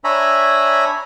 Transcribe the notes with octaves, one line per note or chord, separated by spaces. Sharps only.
D4 C#5 E5 G#5 A#5 B5